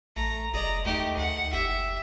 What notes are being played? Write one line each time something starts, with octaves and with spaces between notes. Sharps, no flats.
A1 A3 A#5
F1 G#4 D5 D#5 A#5
D#2 G#3 A3 D#4 G4
D2 F#5
F#1 G4 E5